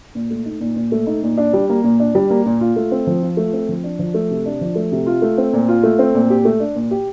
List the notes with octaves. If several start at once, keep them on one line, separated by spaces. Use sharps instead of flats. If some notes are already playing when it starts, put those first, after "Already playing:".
A#2
A3
D#4
A#2
A#2
A3
D#4
A#2
D4
G3
A#3
A#2
D4
G3
A#3
A#2
F4
A3
C4
F3
F4
A3
C4
F3
D4
F3
A3
C3
D4
F3
A3
C3
F4
A3
C4
A#2
F4
A3
C4
A#2
G4
A3
D4
A#2
G4